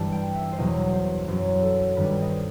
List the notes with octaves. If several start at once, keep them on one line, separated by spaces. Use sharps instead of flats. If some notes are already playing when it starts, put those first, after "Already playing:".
Already playing: G2 E3 G3 A5
G5
E5
C5
E2 B2 F#3 D#5
C5
F#2 F#3 C5
A4
G2 D#3 G3 B4
D#5
C5